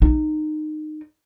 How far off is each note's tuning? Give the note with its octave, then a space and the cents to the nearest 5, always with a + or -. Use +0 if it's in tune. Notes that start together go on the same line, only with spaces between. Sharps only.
D#4 -20